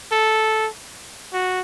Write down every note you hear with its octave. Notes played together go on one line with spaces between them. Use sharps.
A4
F#4